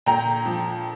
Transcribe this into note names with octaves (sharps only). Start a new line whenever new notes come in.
A#2 G5 A#5
F3